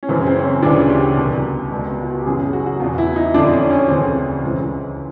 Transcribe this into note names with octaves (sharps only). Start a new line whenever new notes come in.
C#4
F#2 C#3 E3 C4
C4
C#4
D2 C#3 E3 D4
G4
C2 B2
C#2 B2
F4
F#4
G4
F#2 C#3 E3 G#4
G#4
F#4
F#4
E2 B2 F4
E4
D#4
F2 D3 D4
C#4
C#4
D2 C#3 E3 C4
C#2 C#3 E3